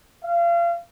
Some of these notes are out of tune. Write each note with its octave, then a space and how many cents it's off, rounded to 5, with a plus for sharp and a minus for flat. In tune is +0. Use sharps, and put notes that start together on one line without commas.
F5 -30